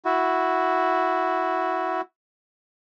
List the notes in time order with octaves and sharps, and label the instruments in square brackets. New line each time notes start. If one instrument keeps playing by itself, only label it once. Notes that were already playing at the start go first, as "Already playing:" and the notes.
[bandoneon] E4 F#4